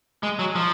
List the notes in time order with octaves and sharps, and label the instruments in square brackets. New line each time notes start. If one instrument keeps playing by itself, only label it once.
[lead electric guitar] G#3
F#3
F3